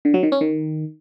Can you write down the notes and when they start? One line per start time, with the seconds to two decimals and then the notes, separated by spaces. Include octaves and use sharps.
0.05 D3
0.14 F#3
0.23 D#3
0.32 C#4
0.41 D#3